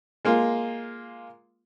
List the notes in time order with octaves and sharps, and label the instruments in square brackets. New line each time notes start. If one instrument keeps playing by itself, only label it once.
[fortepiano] G#3 A#3 F4